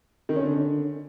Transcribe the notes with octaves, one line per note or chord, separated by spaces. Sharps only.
D#3
C#4
D3